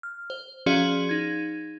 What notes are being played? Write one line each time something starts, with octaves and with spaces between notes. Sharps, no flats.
F6
C5
F3 C#4 F#4 G#4 D5 F5
D#4 G#6